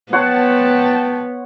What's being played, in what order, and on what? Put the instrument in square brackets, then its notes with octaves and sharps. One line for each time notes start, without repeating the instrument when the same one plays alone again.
[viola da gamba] B3 [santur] C#5 F#5 C6 [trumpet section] G5 A5